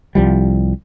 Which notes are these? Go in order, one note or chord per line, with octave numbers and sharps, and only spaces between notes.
C2 F3 G3